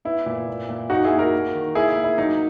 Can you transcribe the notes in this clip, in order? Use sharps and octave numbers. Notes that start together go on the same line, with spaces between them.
B3 E4
A#2
A#2
A#2
A#3 D#4 F#4
E4 G#4
A#3
F#4 A#4
A#3
D#3
A#3 E4 G#4
E4
A#3
E4
F#3 D#4